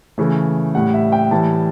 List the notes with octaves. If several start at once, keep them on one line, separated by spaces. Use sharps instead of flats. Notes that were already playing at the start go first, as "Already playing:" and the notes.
C#3 E3 A3
A2 G3 F#5
E5
G5
A2 E3 G3 A5